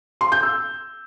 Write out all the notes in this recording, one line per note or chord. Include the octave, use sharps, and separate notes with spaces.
C6
G6
E6